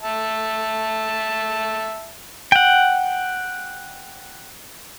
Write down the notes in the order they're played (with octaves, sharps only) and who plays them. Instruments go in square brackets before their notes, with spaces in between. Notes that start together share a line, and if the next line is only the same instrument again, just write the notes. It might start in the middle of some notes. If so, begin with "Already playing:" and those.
[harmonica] E5 A5
[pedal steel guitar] F#5 G5